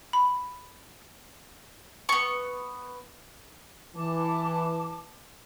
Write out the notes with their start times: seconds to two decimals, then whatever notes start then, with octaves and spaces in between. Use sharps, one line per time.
0.13 B5
2.09 B3 C#6
3.96 E3 A5 D6